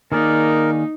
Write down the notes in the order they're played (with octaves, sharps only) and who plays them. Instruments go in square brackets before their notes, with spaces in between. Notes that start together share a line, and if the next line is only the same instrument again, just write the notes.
[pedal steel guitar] D#3 G#4 D5 [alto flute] A#3 [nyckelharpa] D#4 [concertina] A#4